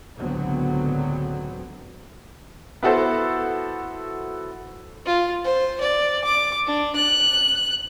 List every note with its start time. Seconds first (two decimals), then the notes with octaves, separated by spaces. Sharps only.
0.17 C#2 A2 D3 F#3 B3 C4
2.83 B3 E4 F#4 A4 C5
5.06 F4
5.44 C5
5.81 D5
6.24 D6
6.66 D4
6.95 F#6